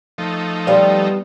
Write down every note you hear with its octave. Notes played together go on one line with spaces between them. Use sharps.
F3 A3 D#4
G3 B3 C5 D5 F5